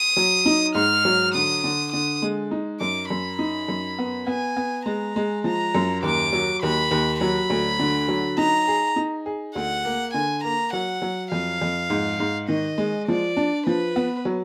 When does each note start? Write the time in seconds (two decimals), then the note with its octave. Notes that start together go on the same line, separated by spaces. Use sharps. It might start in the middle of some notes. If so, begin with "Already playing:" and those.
Already playing: D#6
0.17 F#3
0.46 D#4
0.75 G#2 F6
1.05 F#3
1.34 D3 D#6
1.64 D3
1.92 D3 D#6
2.22 G#3
2.51 D#4
2.81 F#2 D6
3.10 F#2 B5
3.39 D#4
3.68 F#2
3.99 B3
4.27 B3 G#5
4.56 B3
4.86 G#3 A#5
5.16 G#3
5.44 F3 A#5
5.75 F#2
6.03 D#2 D6
6.33 F#3
6.62 D#2 B5
6.91 D#2
7.21 F#3 B5
7.50 D2
7.79 D3
8.08 F#3
8.38 D#4 A#5
8.68 G#4
8.96 D#4
9.26 G#4
9.55 D2 F#5
9.85 A#3
10.14 D3 G#5
10.44 A#3 A#5
10.73 F#3 F#5
11.02 F#3
11.32 F2 F5
11.61 F2
11.90 G#2
12.20 G#2
12.48 D#3 D#5
12.78 G#3
13.08 F3 D5
13.37 D4
13.67 F3 B4
13.96 B3
14.25 F#3